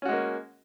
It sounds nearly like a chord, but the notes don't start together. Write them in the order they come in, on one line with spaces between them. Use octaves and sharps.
C#4 F#4 G#3 A#3